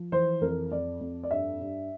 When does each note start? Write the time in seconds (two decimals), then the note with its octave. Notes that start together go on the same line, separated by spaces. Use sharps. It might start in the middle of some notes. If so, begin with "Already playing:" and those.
Already playing: F3
0.12 E3 C5
0.41 F2 A#4
0.71 F2 D5
1.00 F2
1.23 D5
1.31 G2 E5
1.60 G2